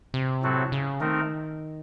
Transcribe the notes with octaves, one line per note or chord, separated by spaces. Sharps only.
C3
A2 F#3 C4 F#4 A4
C#3
D#3 A3 C4 D#4 A#4